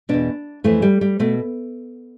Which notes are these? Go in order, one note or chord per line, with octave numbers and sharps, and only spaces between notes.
E2 B2 D4
F2 E3 A3
G3
G3
B2 A3